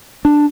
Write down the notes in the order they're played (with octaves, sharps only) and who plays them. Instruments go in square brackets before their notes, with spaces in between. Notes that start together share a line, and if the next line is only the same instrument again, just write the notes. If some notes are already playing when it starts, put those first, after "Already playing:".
[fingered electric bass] D4